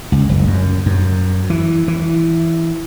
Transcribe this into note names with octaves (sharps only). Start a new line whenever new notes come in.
C#2
F#1
F#2
F#2
E3
E3